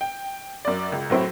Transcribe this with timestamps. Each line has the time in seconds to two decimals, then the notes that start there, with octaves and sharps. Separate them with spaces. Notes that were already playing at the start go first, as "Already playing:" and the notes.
0.01 G5
0.65 F#2 D5
0.92 C#2
1.10 A2 F#3 C4 E4